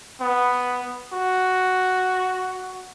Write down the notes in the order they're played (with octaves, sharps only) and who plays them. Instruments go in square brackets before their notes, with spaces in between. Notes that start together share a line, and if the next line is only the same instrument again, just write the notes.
[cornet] B3
F#4